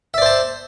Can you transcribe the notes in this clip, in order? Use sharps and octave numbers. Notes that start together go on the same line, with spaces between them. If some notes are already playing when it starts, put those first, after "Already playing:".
C5 D5 E5 A5